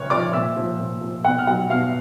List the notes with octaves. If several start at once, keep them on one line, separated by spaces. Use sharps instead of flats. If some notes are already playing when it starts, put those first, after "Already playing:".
Already playing: C#3 F3 C#5 C#6 F6 F#6
F3 D5 D6
A#2 E5 E6
F3
A#2
F3
B2 F#5 F#6
F6
F#3 F#5 F#6
B2 F5 F6